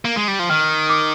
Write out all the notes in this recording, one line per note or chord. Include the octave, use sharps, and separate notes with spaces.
A#3
G#3
G3
F3
D#3 F6
D#6
D6